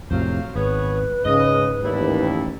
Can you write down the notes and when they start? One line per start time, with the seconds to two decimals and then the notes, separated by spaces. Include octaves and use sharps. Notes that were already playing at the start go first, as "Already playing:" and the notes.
0.11 F2 A2 C3 F#3 C5 F5
0.56 G#1 B3 G#4 B4 C#5
1.25 G#2 C#3 D#5
1.84 A1 D#2 G3 E4